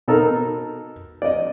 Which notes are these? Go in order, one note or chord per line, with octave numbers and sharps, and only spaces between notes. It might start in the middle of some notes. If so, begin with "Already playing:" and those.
B2 D#4 A4 A#4
D5 D#5